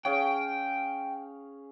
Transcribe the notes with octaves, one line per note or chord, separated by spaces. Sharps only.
C#4 G#4 F5 G5